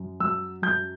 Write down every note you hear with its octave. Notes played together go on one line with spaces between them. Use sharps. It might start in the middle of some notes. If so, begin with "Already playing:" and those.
Already playing: F#2
F#3 E6
F#2 G6